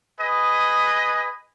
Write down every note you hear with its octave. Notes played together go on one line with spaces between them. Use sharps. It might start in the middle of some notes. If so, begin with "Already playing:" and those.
G#4 B4 D#5